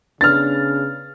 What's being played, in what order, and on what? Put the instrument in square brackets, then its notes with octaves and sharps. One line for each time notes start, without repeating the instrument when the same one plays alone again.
[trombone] C#3 [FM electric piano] B3 D4 B4 [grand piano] F6 A6